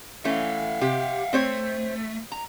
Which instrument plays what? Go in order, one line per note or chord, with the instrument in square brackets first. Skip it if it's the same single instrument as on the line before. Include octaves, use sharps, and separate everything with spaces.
[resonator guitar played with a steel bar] E3 A3 C#4 [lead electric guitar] E5 F5
[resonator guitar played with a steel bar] C3 G4
[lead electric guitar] A3 [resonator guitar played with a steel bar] C4 C5 C#5
[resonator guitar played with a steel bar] A#5